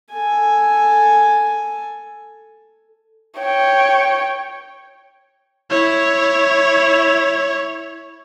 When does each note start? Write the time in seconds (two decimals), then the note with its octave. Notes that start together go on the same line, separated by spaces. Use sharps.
0.13 A4 G#5
3.40 C#5 G5
5.70 E4 C#5